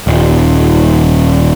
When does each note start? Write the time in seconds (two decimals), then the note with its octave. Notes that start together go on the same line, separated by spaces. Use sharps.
0.07 D#1